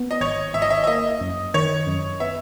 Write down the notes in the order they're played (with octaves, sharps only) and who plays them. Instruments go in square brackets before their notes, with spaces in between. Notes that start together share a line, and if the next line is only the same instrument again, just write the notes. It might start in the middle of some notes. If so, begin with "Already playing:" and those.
Already playing: [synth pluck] B3
[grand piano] D#5
[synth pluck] G#1 [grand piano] C#5
[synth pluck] G#1 [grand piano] E5
[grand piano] D#5
E5
E5
[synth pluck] A#3 [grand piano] D#5
[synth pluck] F#2
[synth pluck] D#3 [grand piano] C#5
[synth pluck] F#2
[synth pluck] B3 [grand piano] E5